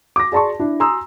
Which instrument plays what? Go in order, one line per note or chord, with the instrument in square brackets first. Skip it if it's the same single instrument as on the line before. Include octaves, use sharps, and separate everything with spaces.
[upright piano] D6 A#6
G#4 D5 A5 C6 C#6
D4 E4
G#5 A#5 C6 D#6 E6